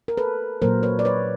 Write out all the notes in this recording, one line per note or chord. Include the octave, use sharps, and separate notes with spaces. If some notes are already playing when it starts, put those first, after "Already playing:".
A#4
A4 B4
A#2 F#3 A#3 A#4 C5
B4 C#5
D5
B4 C#5